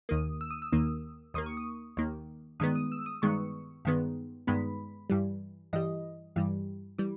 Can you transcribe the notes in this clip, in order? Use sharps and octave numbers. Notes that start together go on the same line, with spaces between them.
D#2 D#3 A#3 D#6
E6
D#6
E6
D#2 D#3 A#3 D#6
D#2 D#3 A#3 D#6
C#6
D#6
D#2 D#3 A#3
G2 D#3 G#3 B3 D#6
D#6
E6
D#6
G2 D#3 G#3 B3 C#6
G2 D#3 G#3 B3
G2 D#3 G#3 B3 B5
G2 E3 G3
G2 E3 G3 D#5
G2 E3 G3
E3 G3